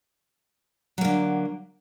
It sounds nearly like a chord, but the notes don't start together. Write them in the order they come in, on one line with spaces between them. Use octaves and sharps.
F#3 A#3 D3